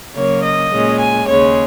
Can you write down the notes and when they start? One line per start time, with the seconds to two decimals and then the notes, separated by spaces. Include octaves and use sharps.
0.16 C#3 F#3 A#3 C#4 C#5
0.44 D#5
0.72 A#2 G#3 C#4
1.00 G#5
1.28 D#2 C#3 G#3 C#5